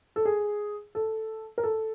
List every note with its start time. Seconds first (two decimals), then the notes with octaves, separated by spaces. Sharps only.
0.16 A4
0.25 G#4
0.95 A4
1.58 A#4
1.63 A4